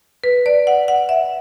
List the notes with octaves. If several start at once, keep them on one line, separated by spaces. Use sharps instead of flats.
B4
D5
F#5
F#5
E5